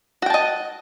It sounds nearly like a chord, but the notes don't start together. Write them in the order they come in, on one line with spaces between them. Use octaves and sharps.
F#4 G5 A5 D#5